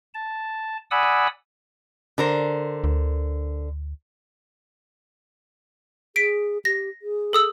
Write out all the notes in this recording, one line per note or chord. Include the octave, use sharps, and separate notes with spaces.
A5
D5 F#5 G#5 B5 D#6 E6
D3 A#4 C5
D2
G#4 B6 D7
G4 A#6
G#4
A4 D#6 E6